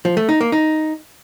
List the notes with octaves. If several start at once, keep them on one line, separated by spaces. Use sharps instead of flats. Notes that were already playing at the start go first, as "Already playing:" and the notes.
F3
A3
D#4
A#3
D#4